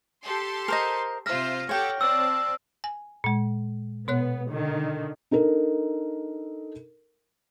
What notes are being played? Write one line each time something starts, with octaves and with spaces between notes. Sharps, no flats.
G4 A4 C6
A#4 C5 D#5
C3 F4 C5 E5 F6 A#6
G4 A4 C#5 F#5 G5
C4 D5 A5 E6
G#5
A#2 G#3
B2 B3 C#5 F#6
D3 D#3
D4 D#4 A4 A#4